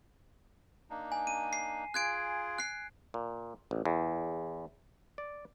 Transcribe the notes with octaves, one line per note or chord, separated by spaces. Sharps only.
A#3 D4 D#4
G#5
D#7
C7
F4 G#4 F#6 G#6 D7
F#6 C7
A#2
A1
E2
D5